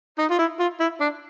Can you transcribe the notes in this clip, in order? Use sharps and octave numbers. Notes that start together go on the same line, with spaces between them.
D#4
F4
E4
F4
E4
D4